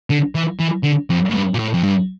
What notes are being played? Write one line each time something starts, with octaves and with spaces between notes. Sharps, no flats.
D3
E3
E3
D3
F2
A2
G2
A#2
A2
F2
G2